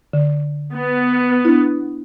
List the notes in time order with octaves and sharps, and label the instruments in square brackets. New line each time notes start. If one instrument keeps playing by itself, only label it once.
[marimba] D3
[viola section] B3
[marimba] D4 E4